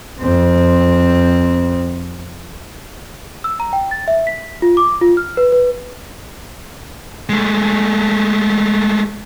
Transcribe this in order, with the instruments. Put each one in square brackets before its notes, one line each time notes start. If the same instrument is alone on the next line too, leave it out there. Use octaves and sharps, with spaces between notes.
[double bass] F2 C4
[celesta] E6
A#5
G5
A6
E5
B6
F4
D6
F4
F6
B4
B4
[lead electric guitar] G#3 A3